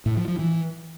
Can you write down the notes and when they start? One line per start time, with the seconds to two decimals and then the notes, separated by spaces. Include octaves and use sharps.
0.06 A2
0.17 F3
0.28 F3
0.39 E3